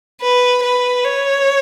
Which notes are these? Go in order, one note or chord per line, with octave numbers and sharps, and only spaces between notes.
B4
B4
C#5